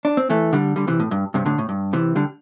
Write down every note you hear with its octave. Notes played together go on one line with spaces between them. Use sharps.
D4
C4
E3 A3
D3 G3
D3 G3
C3 E3
A2
G2
G2 C3
A2 D3
A2
G2
C3 E3
D3 G3